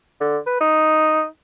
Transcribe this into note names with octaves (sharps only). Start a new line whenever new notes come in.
D3
B4
D#4